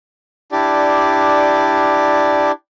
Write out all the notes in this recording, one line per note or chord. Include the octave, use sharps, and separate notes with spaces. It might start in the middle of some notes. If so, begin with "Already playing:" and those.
D4 E4 G4 D5